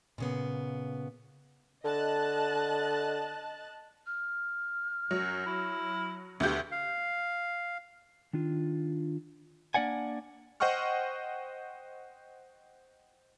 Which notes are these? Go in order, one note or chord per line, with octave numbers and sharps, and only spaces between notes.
A#2 C#3 B3
D3 D#5 A5 F#6
F6
F#2 F#3
E4
D2 B2 G4
F5
D#3 D4 F4
A#3 D4 D5 F#5 G#5
C5 D#5 F#5 G5 C#6 F6